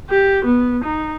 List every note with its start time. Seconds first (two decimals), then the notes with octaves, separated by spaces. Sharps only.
0.10 G4
0.45 B3
0.85 D#4